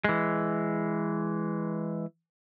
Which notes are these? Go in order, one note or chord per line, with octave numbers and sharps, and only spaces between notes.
E3 G#3